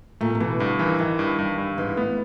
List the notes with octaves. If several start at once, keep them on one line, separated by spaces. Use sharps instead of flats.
A#2 A3
C3
B2 E3
G2 D3
D#3 E3
D#3 E3
G2
G2
G2
G#2 E3
A3 B3